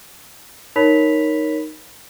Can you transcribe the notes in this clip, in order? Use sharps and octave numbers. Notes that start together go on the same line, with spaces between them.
D#4 A#4 C#5 B5 B6 F7